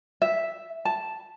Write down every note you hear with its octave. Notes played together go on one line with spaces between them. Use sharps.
E5
A5